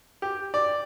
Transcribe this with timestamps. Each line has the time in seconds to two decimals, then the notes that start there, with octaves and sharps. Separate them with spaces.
0.22 G4
0.54 D5